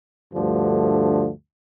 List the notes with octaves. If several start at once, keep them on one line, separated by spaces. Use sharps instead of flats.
D2 G2 D3 F3 A3